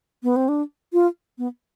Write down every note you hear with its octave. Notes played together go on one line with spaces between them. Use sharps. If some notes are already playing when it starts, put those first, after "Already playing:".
B3
C4
D4
F4
B3